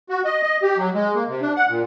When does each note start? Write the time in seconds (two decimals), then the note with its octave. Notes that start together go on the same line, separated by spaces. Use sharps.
0.09 F#4
0.25 D#5
0.43 D#5
0.62 G4
0.77 F#3
0.94 G#3
1.15 A#3
1.28 C3
1.41 D4
1.56 F#5
1.69 A#2